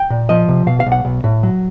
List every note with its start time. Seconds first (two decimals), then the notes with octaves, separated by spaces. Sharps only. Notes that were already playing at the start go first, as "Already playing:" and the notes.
Already playing: G5
0.10 A#2
0.29 F3 D#5
0.49 C3
0.67 B2 F5
0.80 F5
0.86 B1
0.92 F#5
1.05 B1
1.24 A2
1.43 F#3